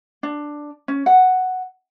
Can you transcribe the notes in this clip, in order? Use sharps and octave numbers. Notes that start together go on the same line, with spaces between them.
D4
C#4
F#5